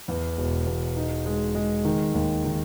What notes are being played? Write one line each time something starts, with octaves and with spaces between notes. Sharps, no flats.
E2
E1
E1
D#4
G#3
G#3
D#3
D#2
D#3